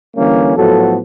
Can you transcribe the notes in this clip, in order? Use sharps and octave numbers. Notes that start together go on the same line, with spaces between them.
D3 E3 G3 A#3 C#4
A2 F3 F#3 B3 F#4 A4